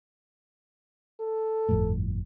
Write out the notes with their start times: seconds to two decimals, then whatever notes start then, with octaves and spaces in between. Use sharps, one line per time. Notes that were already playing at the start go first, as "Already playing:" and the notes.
1.20 A4
1.69 G1 F2 A2